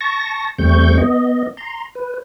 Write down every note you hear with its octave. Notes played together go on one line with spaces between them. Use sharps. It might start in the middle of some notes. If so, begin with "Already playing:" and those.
A5 C#6 A#6
E2 G3 A3 C4 C#6 G6
B3 D#5
A#5 C6
B4